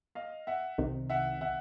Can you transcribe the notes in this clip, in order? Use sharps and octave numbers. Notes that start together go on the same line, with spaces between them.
D#5 F5
E5 F#5
C2 C3 D#3
E5 F#5
E5 F#5